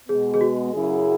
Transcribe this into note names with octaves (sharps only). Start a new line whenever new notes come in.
B2 G#3 B3 G#4
G#4
F#4
F#2 C#3 F#3 E4 G#4